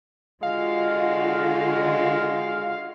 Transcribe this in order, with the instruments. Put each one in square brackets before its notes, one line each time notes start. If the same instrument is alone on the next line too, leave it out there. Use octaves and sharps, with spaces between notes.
[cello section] D3 F4 F#4 [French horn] G#3 [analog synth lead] F5